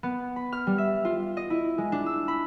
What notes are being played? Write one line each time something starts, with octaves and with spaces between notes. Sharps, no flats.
B3
B5
F6
G3
E5
F4
D#5
E4
G#3
D4
E6
B5